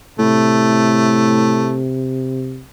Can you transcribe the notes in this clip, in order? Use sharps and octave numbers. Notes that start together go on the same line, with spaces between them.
A2 C3 A3